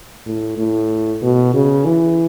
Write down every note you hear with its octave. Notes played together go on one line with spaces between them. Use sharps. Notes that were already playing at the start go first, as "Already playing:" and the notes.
A2
A2
B2
C#3
E3